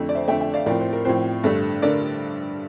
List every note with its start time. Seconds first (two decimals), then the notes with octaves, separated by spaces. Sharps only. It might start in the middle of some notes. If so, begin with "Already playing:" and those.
Already playing: F2 D3 A3
0.09 D5
0.15 C5 E5
0.28 F2 D3 A3 E5 G5
0.41 E5 G5
0.54 D5 F5
0.66 A2 F3 C4 A#4 D5
0.80 C5
0.93 A#4
1.05 A2 F3 C4 C5
1.44 G2 D3 A3
1.82 D3 A3 A#4 D5